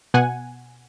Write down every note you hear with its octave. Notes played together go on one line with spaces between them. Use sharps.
B2 F#5 G#5